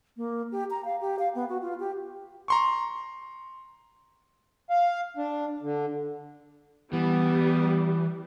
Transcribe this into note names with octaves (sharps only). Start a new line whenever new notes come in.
A#3
G4
A#5
F5
G4
F5
B3
F#4
F4
G4
A#5 C6 C#6
F5
D4
D3
E3 G3 B3